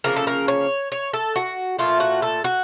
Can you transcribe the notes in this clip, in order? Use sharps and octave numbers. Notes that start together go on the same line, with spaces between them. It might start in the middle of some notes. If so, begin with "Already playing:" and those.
C#3 F3 A#3 C#4 A#4
A4
A#4
C#5
C#5
A4
F#4
A#2 F3 A3 F4
F#4
A4
F#4